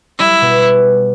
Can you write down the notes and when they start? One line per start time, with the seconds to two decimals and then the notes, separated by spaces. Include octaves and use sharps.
0.18 G3 E4
0.41 B2